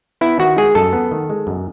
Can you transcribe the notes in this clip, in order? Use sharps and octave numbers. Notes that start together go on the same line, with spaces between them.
B3 E4
D#3 F#4
G#3 G#4
F#2 A4
B3
D#3
G#3
F#2